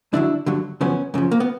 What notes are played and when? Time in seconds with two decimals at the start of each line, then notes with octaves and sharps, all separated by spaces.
0.13 G2 D3 F#3 D4 E4
0.46 G2 D3 F#3
0.81 F#2 C#3 F3 B3 C#4
1.14 F#2 C#3 F3
1.31 A#3
1.40 B3